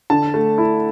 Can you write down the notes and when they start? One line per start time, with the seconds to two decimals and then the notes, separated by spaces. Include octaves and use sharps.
0.10 D3 A5
0.34 A3
0.58 E4